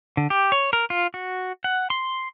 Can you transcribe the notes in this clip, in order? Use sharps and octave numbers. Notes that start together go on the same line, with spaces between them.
D3
G4
C#5
A#4
F4
F#4
F#5
C6